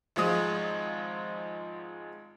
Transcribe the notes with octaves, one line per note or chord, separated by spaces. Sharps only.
G#1 F3 G#3 D#6